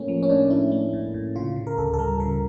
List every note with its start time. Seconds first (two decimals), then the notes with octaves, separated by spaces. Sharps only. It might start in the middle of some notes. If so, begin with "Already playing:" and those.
Already playing: A2 A3 A#3 C#4
0.08 F3
0.23 C#4
0.29 A2 D4
0.50 A3 E4
0.72 A3
0.93 A2
1.14 A2
1.36 C#3 F4
1.56 C#3
1.67 A#4
1.78 D2 A4
1.93 A4
1.99 G3 A#4
2.20 C#3 A#4